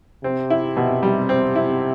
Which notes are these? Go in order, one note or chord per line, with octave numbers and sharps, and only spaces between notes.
C3 C4
E4
B2
G3
C4
E4